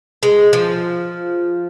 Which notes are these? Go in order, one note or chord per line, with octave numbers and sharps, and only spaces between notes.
G#3
F3